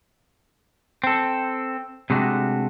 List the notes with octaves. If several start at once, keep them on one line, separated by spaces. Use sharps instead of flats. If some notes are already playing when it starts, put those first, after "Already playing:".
C4 A4
C3 G#3 A3 D4 F#4